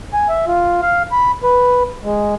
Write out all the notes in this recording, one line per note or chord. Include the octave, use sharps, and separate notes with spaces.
G#5
E5
F4
F5
B5
B4
G#3